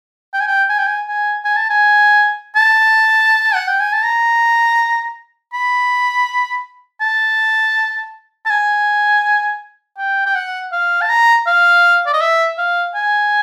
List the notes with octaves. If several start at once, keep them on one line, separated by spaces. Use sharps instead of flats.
G5
G#5
G5
G#5
G5
G#5
G#5
G#5
A5
G#5
A5
F#5
G5
G#5
A5
A#5
B5
A5
A5
G#5
G5
G5
F#5
F5
A5
A#5
F5
D5
D#5
E5
F5
G#5